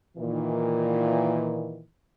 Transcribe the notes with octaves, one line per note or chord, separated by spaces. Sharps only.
A#2 D#3 E3